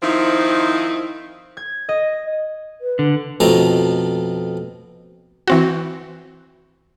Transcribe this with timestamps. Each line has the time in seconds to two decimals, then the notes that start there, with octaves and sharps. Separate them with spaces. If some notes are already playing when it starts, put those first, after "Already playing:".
0.02 D#3 F3 C4 D#4 E4
1.57 G#6
1.89 D#5
2.81 B4
2.99 D3
3.40 F2 B2 A3 A#5
5.48 E3 C4 F#4